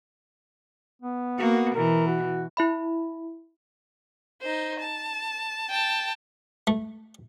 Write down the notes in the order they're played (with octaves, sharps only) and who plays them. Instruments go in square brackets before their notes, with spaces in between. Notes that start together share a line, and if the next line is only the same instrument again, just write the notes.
[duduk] B3
[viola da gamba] A#3 F#4
[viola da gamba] B2 E3 [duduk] A#4
[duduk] F#4
[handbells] E4 E5 B5
[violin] D#4 C5
A5
G5 A5
[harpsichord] A3